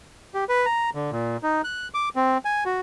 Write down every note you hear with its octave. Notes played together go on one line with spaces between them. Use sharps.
G4
B4
A#5
D3
A#2
D#4
F#6
D6
C4
G#5
F#4